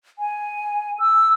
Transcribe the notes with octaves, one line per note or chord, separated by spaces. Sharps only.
G#5
E6